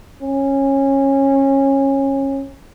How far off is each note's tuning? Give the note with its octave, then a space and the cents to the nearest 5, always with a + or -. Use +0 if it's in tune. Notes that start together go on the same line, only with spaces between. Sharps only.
C#4 -20